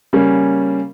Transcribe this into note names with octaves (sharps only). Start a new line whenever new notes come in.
C#3 G3 A#3 C#4